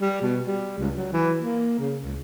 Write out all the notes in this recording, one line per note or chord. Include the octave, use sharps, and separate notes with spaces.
G3
B2
G3
C#2
F#3
E3
A#3
C#3
C#2